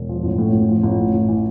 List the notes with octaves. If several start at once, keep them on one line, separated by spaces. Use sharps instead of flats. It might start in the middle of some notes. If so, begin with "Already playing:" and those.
Already playing: E1
F3
A1
A2
A1
F3
A1
A2
A1
E3